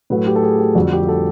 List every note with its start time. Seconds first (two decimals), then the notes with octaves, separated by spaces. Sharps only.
0.10 A2 F#3 A3 B4
0.27 G4
0.36 A4
0.43 G#4
0.59 G4
0.75 F2 D3 G3 F#4
0.93 G4
1.09 A4